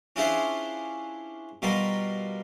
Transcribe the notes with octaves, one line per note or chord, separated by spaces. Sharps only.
C#4 D4 E4 F4 G#4 C5
B2 G3 F4 A#4